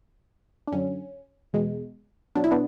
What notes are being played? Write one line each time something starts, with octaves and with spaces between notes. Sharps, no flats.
D4
F#2 D3 F#3 C#4
E2 B2 G#3
B2 F#3 D4
E4
B3 D4